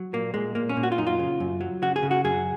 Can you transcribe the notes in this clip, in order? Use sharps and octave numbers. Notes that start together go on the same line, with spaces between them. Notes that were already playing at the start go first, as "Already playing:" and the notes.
Already playing: F#3
A#2 A#3
A#2 G#3
A#2 A#3
C#4
A#2
F#4
F4
F#2 D#4
F4
C#3
F#2
F#3
C#3 F#4
G#4
C#3
F#4
F#2 G#4